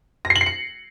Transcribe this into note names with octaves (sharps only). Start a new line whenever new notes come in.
A#6
C7
F#7
C7
C#7